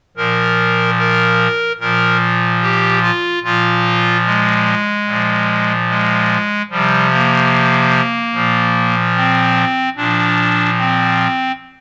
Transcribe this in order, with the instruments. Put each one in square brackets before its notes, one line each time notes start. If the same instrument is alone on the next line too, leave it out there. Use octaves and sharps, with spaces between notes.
[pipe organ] A#2 F3 A#4
A#4
A#2 F3 A#4
G4
F4
A#2 F3 F4
G#3
A#2 F3
G#3
C3 F3 G3
A#3
A#2 F3
C4
A#2 F3 D4
C4